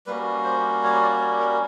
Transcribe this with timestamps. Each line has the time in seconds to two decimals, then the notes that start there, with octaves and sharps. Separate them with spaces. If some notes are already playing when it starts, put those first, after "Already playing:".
0.07 G3 A#3 C#4 F#4 B4
0.44 C5
0.83 C#5
1.02 D5
1.20 C#5
1.39 A#4